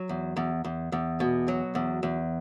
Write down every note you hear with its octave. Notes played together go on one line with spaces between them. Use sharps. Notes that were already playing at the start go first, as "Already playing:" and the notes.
Already playing: F#3
E2
E2
E2
E2
B2
F#3
E2
E2